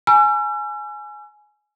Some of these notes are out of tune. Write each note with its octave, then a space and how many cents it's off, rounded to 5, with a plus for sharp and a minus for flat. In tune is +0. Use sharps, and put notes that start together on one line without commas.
G#5 +10 B5 -45 E6 +45